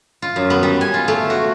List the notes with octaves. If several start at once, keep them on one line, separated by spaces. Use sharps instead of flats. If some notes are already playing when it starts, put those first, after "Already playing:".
F4
F#2
B3
G3
G#5
F4
A3
F#4